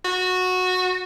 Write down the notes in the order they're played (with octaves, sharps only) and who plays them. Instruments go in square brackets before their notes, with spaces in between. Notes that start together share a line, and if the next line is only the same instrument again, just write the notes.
[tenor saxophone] F#4